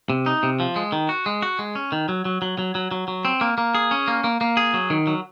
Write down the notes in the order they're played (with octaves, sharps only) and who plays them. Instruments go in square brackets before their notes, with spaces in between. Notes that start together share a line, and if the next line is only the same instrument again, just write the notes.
[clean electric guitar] C3
D#4
C3
F3
G#3
D#3
F#4
G#3
F#4
G#3
C#4
D#3
F#3
F#3
F#3
F#3
F#3
F#3
F#3
C4
A#3
A#3
G#4
C#4
A#3
A#3
A#3
G#4
F#3
D#3
F#3